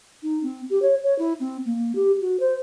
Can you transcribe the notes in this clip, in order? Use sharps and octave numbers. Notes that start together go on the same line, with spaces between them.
D#4
C4
G4
C#5
C#5
E4
C4
A#3
G4
F#4
C5